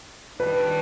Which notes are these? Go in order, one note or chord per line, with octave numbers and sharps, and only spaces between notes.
D#3 G3 D4 B4